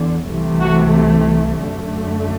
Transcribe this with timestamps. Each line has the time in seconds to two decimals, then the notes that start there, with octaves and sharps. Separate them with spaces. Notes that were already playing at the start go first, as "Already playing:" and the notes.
Already playing: E2 D3
0.27 C2 C3 E3 A3
0.60 F#4
1.62 F#2 D3 A3